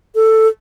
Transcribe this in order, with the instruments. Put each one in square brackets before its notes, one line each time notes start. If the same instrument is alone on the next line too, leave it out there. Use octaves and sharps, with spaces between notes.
[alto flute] A4